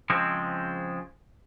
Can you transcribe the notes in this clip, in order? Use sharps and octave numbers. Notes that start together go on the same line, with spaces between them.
C#3 F3 G#3 C4